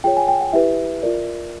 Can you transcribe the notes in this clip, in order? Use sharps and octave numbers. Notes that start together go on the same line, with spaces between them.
F4 G#4 C#5 G5
G#5
G5
F#5
E4 G4 B4 E5
F4 A#4 D5